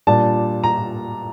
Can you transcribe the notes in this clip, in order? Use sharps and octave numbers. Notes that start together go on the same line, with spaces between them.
A#2 G3 D4 A5
A#5